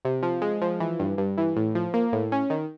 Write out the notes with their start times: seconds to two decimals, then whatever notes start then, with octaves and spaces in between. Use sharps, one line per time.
0.05 C3
0.23 F3
0.42 G#3
0.62 F3
0.80 E3
1.00 G2
1.18 G2
1.38 E3
1.56 A2
1.75 F3
1.94 A#3
2.12 A2
2.32 C#4
2.50 D#3